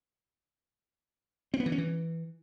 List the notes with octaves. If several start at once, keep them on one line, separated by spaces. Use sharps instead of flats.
C4
B3
E3
C#4
E3